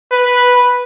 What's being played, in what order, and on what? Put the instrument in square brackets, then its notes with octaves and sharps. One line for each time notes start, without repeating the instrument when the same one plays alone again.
[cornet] B4